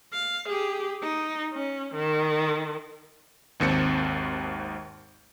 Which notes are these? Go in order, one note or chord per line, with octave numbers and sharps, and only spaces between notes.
F5
G4 G#4
D#4
C#4
D#3
G#1 D#2 C4 C#7